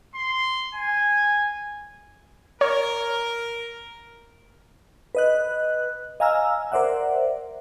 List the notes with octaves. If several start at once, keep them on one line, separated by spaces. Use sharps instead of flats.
C6
G#5
A#4 C#5
B4 D#5 F#6
D#5 F5 G#5 A#5 E6 F6
A#4 C5 D5 E5 F#5